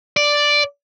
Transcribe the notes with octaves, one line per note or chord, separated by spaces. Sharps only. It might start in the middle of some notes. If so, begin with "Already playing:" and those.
D5